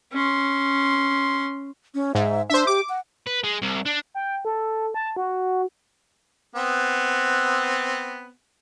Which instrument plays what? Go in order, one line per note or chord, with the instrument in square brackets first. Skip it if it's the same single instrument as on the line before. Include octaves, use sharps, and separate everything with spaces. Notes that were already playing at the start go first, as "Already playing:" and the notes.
[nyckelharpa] C#4 C6
[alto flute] C#4
[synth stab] G#2 [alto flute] E5
[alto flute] D4 [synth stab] C5 E5
[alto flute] G4 [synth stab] D6
[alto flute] F#5
[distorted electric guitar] B4
G#3
C2
D4
[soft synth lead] G5
A4
A5
F#4
[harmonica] B3 C4